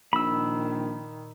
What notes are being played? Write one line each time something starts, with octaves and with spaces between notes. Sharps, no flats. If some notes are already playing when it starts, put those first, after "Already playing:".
A#1 A#2 D#3 B5 E6